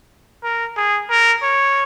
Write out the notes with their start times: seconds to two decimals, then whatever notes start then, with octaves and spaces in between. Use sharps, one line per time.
0.43 A#4
0.77 G#4
1.10 A#4
1.42 C#5